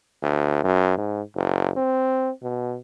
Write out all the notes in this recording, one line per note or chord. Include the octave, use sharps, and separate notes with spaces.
D2
F#2
G#2
F#1
C4
B2